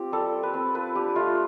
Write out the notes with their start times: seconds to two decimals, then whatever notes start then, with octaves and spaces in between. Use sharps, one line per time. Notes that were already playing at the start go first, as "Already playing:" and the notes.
Already playing: C4 F4 G4
0.12 G3 A4
0.34 F4
0.43 B4
0.54 C4
0.75 F4 B4
0.95 D4 G4
1.16 A3 F4